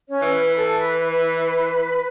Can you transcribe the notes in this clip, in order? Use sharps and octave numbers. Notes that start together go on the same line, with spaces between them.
C#4 C#5
E3
B4
A4
B4
B4